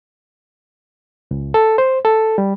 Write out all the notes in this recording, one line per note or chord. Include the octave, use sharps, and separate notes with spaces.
C#2
A4
C5
A4
G3